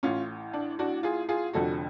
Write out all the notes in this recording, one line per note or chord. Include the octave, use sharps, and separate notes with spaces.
A1 A2 C#4 F4
D4
D4 F#4
F4 G#4
F4 G#4
F1 F2 D3 F#4 A4